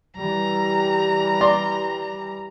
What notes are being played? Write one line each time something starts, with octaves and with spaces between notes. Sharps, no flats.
E3 G3 A#5
D5 C6